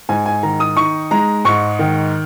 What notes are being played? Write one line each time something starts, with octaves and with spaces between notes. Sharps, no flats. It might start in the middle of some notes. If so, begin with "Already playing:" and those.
G#2 G#5
G#5
D#3 A#5
D#6
D#4 C#6
G#3 A#5
G#2 C#6
D#3